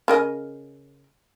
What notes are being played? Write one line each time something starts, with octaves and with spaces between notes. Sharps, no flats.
C#3 A#4 D#5